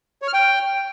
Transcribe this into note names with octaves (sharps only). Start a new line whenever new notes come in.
C#5
F6
G5